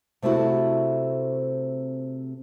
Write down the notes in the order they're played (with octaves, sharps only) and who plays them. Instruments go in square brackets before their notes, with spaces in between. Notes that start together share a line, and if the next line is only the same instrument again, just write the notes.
[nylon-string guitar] C3 A3 C4 E4 F#4 A4